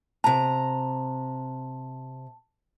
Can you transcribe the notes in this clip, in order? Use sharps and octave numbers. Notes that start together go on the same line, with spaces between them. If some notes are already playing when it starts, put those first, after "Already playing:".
C3 A5 A#5